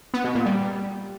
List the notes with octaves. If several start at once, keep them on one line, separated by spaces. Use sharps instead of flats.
B3
B2
A#2
G3